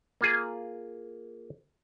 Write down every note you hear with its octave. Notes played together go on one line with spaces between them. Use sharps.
A#3 F4 G#4